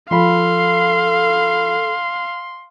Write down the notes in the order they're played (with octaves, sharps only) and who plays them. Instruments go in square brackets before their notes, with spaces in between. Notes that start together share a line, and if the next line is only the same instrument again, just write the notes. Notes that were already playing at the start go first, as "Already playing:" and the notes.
[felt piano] F3 B5 [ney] A4 [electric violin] F5 [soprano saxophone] C6